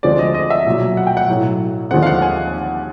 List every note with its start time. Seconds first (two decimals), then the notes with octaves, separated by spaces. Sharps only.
0.03 D2 D3 F3 G#3 C4 D5
0.19 D#5
0.35 D#5
0.50 E5
0.66 B1 A#2 F#3
0.97 F#5
1.07 G5
1.17 F#5
1.28 B1 A2 F#3
1.91 D#2 D3 F3 G#3 C4 F#5
2.03 F5
2.07 F#5
2.22 G#5